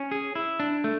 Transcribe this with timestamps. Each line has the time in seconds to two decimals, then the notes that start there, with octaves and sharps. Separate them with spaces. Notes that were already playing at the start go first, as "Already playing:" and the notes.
Already playing: C#4
0.11 G#4
0.35 E4
0.60 D4
0.84 A3